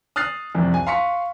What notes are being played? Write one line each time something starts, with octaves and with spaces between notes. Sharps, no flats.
D#6 F6 F#6 A6 C7
C2 F2
G#5
F5 C6 C#6 B6 C#7